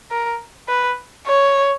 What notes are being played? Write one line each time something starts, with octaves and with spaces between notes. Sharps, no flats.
A#4
B4
C#5